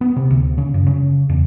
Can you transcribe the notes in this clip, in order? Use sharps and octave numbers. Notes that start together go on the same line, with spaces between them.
B3
C3
D2
C#3
F#2
C#3
E2